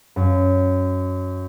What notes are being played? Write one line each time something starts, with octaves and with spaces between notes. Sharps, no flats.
F#2